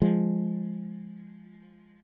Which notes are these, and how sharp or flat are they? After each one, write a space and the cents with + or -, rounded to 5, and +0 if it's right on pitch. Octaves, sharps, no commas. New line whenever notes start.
F3 +0 G#3 -5